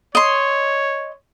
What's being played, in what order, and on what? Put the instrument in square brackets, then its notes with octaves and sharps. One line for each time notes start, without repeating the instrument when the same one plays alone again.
[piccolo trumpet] C#5 [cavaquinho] D#5 C6